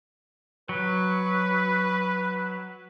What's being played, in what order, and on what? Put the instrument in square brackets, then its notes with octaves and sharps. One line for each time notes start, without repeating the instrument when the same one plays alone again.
[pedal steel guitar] F#3 [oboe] B4